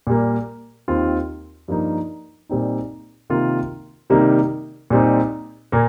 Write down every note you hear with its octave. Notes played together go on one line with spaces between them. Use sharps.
A#2 G3 A#3
D#2 D#3 C4 F4
G2 F3 A#3 D#4
A#2 G3 C4 D#4
C3 D#3 A#3 F4
C3 D#3 G3 A#3 D#4
A#2 G3 C4 D#4
A#2 A#3